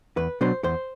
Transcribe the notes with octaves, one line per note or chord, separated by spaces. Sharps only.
E2 B4
B2 F#3 B3 D4 C5
E2 C5